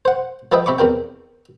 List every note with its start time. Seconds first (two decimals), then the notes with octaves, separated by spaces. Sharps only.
0.05 C5 F#5
0.52 F3 A4 B4 D#5 E5 G5
0.66 C3 E5 B5 C#6 D6
0.78 E2 C3 A#4 G5